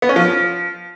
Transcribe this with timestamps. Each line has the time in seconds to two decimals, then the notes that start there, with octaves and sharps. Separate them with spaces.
0.02 B3
0.09 C#4
0.16 F3